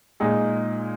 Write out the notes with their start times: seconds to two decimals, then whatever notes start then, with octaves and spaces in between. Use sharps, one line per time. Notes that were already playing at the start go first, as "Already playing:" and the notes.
0.20 A#2 G#3 D#4 G#4